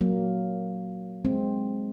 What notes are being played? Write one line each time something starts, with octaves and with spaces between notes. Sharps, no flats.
F#3 A#3
G#3 C4